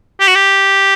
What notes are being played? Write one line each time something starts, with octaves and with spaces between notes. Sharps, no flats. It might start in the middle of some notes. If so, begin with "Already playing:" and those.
G4
F#4
G4